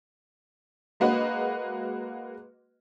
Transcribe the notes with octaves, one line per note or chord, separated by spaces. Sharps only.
G#3 A#3 F#4 B4 D#5